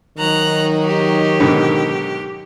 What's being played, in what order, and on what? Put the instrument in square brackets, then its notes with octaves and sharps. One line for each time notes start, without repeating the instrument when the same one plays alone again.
[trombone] D#3 [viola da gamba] F#3 D#4 [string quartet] A#5 F#6
[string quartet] G4
[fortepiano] G#2 B2 D3